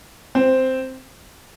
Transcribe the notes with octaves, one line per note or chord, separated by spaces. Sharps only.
C4